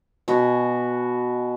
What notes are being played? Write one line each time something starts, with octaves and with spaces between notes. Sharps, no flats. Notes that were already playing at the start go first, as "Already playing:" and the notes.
B2 F#4 G#5